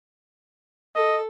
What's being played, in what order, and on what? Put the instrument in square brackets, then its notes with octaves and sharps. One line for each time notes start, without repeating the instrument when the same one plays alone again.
[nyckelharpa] A4 [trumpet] D#5